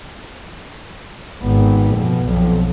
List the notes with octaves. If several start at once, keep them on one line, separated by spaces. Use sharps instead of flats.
G#1 B3
F2 B2
B1 F2